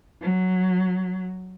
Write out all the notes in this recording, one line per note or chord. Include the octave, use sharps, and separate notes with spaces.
F#3